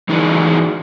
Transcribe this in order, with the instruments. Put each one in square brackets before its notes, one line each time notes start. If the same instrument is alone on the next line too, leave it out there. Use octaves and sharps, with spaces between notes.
[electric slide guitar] E3 D#4 E4 F#4 G#4 D5